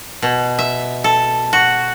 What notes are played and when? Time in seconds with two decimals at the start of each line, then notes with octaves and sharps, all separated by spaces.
0.22 B2
0.59 E5
1.04 A4
1.53 F#4